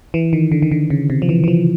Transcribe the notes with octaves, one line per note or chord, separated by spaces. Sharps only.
E3
D#3
D3
D#3
D3
C#3
C3
F3
E3
E3
F3